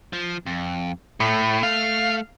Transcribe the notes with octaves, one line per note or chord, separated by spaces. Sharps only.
F3
F2
A2 A3
F5